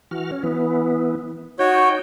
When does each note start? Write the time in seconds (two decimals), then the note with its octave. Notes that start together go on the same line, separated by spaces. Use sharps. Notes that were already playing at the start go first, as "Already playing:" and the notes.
0.11 E3 F#4 F6
0.32 C#4
0.44 E3 B3
1.59 D#4 F#4 C#5 G5